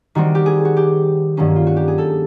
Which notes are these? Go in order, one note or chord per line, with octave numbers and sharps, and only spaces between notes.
D#3 G3 C4 F#4
G4
G#4
F#4
G4
G2 D#3 F#3 A#3 C#4
F4
F#4
G4
G#4
A4